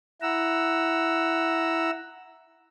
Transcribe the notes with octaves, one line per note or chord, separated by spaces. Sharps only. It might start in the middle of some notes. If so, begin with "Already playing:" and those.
E4 F#5 A#5 E6